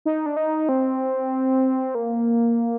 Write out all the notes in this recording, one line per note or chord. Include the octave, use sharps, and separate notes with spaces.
D#4
D4
D#4
C4
A#3